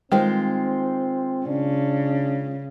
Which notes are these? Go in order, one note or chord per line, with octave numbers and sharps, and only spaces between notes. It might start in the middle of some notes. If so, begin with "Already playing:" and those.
D#3 G#3 C4 F4 C5
C#3 D4